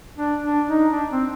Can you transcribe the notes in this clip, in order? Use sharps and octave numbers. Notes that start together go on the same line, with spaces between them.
D4
D4
D#4
D4
C4